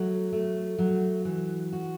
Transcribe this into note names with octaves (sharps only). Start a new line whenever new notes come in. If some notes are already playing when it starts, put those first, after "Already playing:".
Already playing: F#3 A3
A3
F#3
E3
F#4